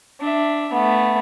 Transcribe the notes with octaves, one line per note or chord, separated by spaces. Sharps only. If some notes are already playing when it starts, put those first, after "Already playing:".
D4 E5
A3 B3